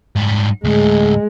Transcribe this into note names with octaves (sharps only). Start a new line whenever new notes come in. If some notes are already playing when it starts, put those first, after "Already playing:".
G#2 G3
D2 A2 G#3